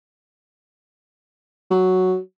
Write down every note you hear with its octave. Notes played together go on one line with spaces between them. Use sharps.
F#3